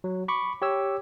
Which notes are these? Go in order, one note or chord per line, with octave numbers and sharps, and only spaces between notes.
F#3
B5 C#6 D6
G4 C#5 E6